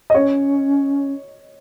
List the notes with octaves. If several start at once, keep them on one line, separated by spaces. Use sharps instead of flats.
D#5
C#4 C#5